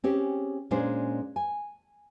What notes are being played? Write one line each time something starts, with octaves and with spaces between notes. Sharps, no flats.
C4 C#4 G4 G#4
A#2 G#3 C#4 D4 C5
G#5